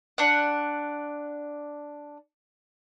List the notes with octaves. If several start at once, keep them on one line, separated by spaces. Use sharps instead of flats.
D4 F#5